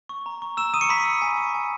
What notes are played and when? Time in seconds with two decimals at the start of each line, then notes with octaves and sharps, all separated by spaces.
0.09 C#6
0.26 A#5
0.42 C#6
0.57 A#5 E6 E7
0.74 D#6 D#7
0.81 C#6 C#7
0.89 A#5 B5 B6
1.05 E6
1.22 G#5
1.37 C#6
1.54 G#5